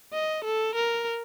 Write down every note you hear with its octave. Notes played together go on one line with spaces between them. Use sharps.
D#5
A4
A#4